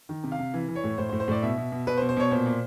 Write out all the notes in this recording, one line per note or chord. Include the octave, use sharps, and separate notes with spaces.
D#3
C3
F5
C3
E3
E3
C#5
A2
A2 C5
C5
A2
C5
A2 D5
B2 E5
B2
B2
B2 B4
C5
B2
C5
B2 C#5
A#2 C5
A#2